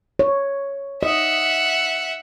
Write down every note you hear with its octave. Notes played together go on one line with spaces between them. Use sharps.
C#5
D#5 E5 F#5